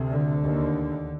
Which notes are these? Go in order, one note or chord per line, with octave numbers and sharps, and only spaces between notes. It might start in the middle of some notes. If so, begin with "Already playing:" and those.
Already playing: D2 C3
D3
D#2